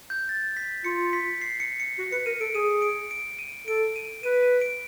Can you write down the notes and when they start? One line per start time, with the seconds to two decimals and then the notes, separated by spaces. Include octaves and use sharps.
0.10 G6
0.29 A6
0.57 B6
0.84 F4 C#7
1.13 B6
1.42 C7
1.60 C#7
1.80 C#7
1.99 F#4
2.12 B4 C#7
2.26 A#4 D#7
2.40 A4 D7
2.54 G#4 D#7
2.82 D7
3.11 D7
3.39 D#7
3.67 A4 D7
3.96 D#7
4.23 B4 D#7
4.43 D#7
4.61 D7